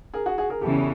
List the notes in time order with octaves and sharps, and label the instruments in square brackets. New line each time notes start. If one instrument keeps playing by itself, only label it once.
[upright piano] G#4 A#4
F#4 G#4
F#4 G#4
G#4 A#4
[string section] E2 C#3 E3 [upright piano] G4 A4